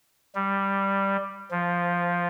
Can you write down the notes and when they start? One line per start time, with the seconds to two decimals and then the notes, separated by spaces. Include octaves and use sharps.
0.35 G3
1.51 F3